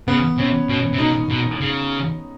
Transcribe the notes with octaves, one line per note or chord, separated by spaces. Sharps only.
C#3 B3
C3 C#4
B2 C#4
C3
B2 D#4
B2
C#3